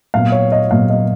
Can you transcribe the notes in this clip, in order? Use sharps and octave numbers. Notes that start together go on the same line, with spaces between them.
A#2 F#3 B3 F5
C#5
D#5
A#2 F#3 B3 F5
D#5